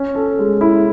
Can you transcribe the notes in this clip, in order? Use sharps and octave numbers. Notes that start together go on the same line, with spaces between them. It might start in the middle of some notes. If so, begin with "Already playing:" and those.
Already playing: C#4
A4
G#3
E4